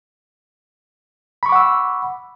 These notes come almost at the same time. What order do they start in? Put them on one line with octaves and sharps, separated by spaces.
B5 C#6 D6 F#5 E6